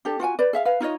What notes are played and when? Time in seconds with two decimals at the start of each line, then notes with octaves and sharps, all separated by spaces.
0.05 D4 G4 A4
0.20 F4 F#4 G5 G#5
0.39 B4 D5
0.53 G#4 E5 F5
0.65 B4 F5
0.80 D#4 F4 C#5 D#5